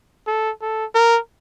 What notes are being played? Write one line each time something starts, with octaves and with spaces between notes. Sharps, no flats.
A4
A4
A#4